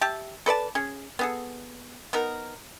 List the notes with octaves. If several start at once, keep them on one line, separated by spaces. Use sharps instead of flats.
G4 E5 A5
A4 B4 D5 A5
C#4 G#4
B3 G#4 A4
B3 D#4 A#4